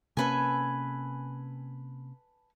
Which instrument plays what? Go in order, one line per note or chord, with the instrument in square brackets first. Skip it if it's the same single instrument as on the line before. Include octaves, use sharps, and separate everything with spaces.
[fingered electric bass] C3 A#3 C#4 [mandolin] A4 B4 G#5